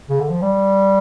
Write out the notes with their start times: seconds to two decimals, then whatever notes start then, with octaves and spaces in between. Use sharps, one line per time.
0.10 C#3
0.20 D3
0.30 F3
0.42 G3